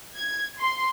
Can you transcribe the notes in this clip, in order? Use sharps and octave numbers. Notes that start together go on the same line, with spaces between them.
G#6
C6